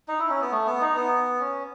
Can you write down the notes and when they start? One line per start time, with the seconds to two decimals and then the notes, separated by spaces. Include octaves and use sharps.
0.08 D#4
0.19 E4
0.29 C#4
0.41 B3
0.52 A3
0.67 B3
0.81 D#4
0.96 B3
1.40 C#4